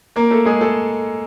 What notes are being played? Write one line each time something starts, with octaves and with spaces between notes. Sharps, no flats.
A#3 A#4
A3 A4
G#3 G#4
A3 A4